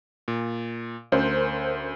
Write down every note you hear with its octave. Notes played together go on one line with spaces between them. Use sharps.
A#2
D2 C#4 A#4 C5